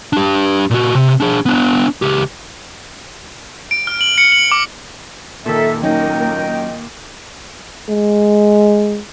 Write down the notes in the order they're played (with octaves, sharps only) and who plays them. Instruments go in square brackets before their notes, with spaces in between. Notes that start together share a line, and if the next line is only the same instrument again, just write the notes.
[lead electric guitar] D4 G4
A#2 F#4
C3
D4 G#4
B3 D4
C#2 G4
[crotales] D7
F6
F#7
C#7
F#7
D6
[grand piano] A#2 D#3 [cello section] A4 A#4 [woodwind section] E5
[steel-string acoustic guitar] F#3 C#4 D#4 [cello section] A#3 A#4 [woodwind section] D#5 G5
[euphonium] G#3